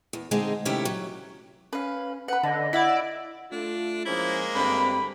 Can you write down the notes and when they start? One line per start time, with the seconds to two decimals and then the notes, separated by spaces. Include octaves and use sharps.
0.13 E2
0.31 D3 G#3 C4 D#4 G#4
0.65 C3 D#3 A3 C#4 E4 G4
0.85 F#3
1.73 C#4 B4 F5
2.28 B4 F#5 B5
2.43 D3 D#5 B5
2.73 E4 D5 E5 F#5
3.52 A3 D4 F4
4.05 F3 G#3 A#3 C#4 E4 C5
4.55 G2 D3 C4 B5